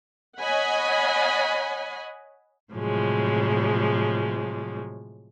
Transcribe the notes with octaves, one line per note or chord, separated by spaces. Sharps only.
C#5 D#5 F#5 G#5 B5
A2 C3 F3 F#3 G#3